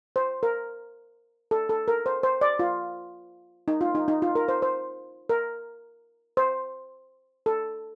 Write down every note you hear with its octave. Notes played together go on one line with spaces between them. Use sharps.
C5
A#4
A4
A4
A#4
C5
C5
D5
F4
D#4
F4
D#4
D#4
F4
A#4
C5
C5
A#4
C5
A4